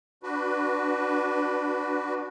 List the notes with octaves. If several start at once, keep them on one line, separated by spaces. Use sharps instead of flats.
D4 F#4 B4